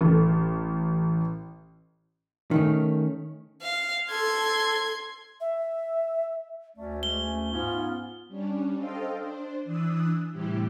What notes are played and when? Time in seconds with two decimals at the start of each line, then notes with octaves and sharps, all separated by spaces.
0.01 A1 A4
2.51 D#3 A3 C#4
3.62 F5
4.10 A4 C6 G#6
5.41 E5
6.77 D2 A3 C#4 D5
7.03 G#3 G7
7.23 G#5
7.52 G#2 B3 C#4 F4
8.28 G3 C#4 D4
8.78 A4 C5 D#5 F5 G5
9.16 D4 C5
9.64 E3 D4 D#6 E6 F#6
10.32 A2 C3 E3 G3 E4 G4